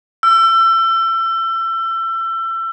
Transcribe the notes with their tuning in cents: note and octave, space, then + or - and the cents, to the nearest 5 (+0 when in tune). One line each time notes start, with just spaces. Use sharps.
E6 +30